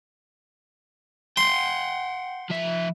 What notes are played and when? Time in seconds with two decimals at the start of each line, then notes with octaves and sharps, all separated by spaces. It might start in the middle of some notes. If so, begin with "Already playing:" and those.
1.37 F#5 G5 C6
2.50 F3 E5